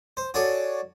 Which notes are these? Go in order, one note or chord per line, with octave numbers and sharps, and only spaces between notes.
C5
F#4 G#4 A4 C#5 D5